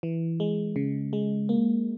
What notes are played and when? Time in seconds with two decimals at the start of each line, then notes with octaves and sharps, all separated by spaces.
0.03 E3
0.40 G#3
0.76 C#3
1.13 G#3
1.49 A#3